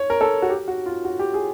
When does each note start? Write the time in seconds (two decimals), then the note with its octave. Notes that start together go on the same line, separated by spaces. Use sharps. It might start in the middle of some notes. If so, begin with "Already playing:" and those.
Already playing: C#5
0.10 A#4
0.21 A4
0.42 F#4
0.49 G4
0.68 F#4
0.86 F4
1.05 F#4
1.19 G4
1.34 G#4